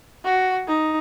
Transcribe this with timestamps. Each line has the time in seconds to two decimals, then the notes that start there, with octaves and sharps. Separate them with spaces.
0.25 F#4
0.67 D#4